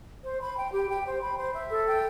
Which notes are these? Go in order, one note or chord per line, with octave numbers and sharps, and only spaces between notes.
C5
B5
G5
G4
G5
C5
B5
C5
E5
A4
G5